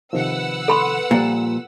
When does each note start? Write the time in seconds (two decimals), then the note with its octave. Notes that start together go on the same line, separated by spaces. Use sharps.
0.13 C3 D#3 F3 B4 F#5 E6
0.68 A4 B5 C6
1.11 A#2 F3 G3